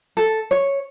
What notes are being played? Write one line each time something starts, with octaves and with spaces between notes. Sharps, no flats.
A4
C#5